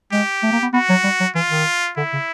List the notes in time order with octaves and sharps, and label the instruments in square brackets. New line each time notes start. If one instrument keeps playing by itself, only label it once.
[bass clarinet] G#3 [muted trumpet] G4
[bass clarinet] A3
A#3
B3
[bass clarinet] B3 [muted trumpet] F#4
[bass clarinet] F#3
G3
F#3
[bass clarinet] E3 [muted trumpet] F4
[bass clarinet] D#3
[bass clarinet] D3 [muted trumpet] E4
[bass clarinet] C#3